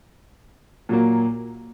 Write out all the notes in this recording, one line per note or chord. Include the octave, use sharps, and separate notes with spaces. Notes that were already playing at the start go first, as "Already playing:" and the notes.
A#2 F#3 A#3